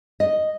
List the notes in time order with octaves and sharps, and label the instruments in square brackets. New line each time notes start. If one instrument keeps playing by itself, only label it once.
[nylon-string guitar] D#5